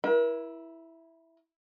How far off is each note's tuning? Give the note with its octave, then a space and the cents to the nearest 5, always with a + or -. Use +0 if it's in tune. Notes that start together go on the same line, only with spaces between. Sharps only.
E4 +0 A#4 +45